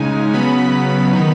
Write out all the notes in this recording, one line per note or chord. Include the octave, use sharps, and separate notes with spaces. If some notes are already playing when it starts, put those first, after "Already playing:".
Already playing: C#3 G#3 D#4 G#5
C#3 F#3 B3 B5
D#3 B3 D#4 B5